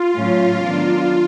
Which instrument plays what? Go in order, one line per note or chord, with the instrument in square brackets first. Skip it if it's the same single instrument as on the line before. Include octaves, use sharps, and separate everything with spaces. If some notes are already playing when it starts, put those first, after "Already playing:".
Already playing: [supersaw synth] F4
[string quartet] A2 F#3 A3 C#4
D#3 F#3 B3 D4